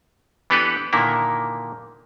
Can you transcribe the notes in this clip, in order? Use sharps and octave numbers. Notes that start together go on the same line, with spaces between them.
E3 B3 D4 G4 A4 B4
A#2 D3 D#3 A#3 E4